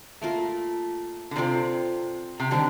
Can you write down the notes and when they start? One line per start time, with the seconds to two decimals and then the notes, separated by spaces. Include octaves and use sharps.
0.21 A3 A#3 F4 A#4 F5
1.31 D3
1.36 C3 C4 F4 A4 D5
2.40 C3
2.51 D3 D#3 G3 C4 G4